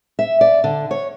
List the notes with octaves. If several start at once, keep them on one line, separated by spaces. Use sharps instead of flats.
E5
D5
D3
C#5